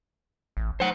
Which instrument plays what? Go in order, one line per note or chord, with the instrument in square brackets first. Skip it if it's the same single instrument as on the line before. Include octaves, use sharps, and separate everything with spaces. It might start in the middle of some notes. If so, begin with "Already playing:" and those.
[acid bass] A1
[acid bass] F#3 [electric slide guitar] C5 F#5